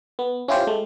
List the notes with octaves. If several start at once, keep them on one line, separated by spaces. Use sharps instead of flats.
B3
C#4 E4 F4 G4 C5
G#3 A3